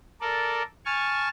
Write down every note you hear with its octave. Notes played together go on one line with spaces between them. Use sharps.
A4 A#4 D5
G#5 A5 C#6 F6